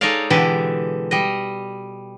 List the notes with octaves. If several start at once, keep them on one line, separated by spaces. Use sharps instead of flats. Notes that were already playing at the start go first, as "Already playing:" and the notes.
G#3 D#4 A4 C#5 D5 F5
B2 D3 E3 G#3 G4 A4
G3 D#5